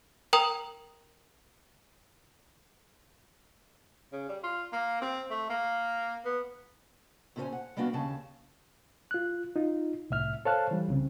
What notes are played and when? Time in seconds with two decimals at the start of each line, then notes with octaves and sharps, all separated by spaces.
0.33 A#4 G5 A#5 D#6 F7
4.12 C#3
4.29 G3
4.44 F4
4.73 A#3
5.02 C4
5.30 A3
5.49 A#3
6.25 B3
7.36 A#2 C#3 C#4 A4 C5 G#5
7.53 F#5
7.77 G3 A#3 B3 D4 F#4
7.93 D#2 C#3 A5
9.11 F4 F#6
9.56 D#4 F4
10.10 C2 A2 E5 F6
10.45 A4 C5 C#5 F5 A5 F#6
10.71 E3 G3
10.88 C2 C#3 C4